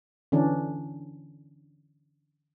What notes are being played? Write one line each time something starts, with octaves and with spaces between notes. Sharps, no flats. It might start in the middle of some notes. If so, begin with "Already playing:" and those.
D3 E3 C#4 D4